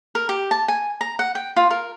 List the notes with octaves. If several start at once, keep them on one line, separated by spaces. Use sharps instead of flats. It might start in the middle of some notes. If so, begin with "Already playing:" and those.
A#4
G4
A5
G#5
A#5
F#5
G5
F4
A#4